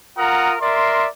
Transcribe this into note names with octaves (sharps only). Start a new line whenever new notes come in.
F4 A#4 F#5 A#5 D#6
A#4 D5 E5 C6